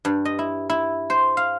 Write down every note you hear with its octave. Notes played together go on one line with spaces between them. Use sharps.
G2
D#5
E4
E4
C5
F5